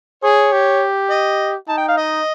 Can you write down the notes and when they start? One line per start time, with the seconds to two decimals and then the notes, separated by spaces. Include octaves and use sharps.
0.23 G#4 C#5
0.52 G4
1.10 D#5
1.68 D#4 A5
1.78 G5
1.88 F5
1.98 D#5